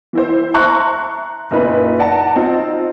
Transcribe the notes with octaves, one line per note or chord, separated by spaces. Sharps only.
E3 E4 C5
E5 A5 A#5 C6 C#6 F#6
F#1 A#2 D#4 B4 B5
D5 F#5 A5 A#5
C4 D#4 F4